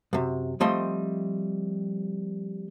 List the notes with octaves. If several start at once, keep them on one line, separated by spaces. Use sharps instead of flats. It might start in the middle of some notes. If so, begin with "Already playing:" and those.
F#2 C3
F3 G3 A3 C4 D#5 C6